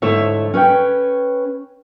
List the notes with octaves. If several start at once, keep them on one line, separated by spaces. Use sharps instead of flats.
D2 G#2 A3 E4 C#5 E5
C#4 B4 C#5 G5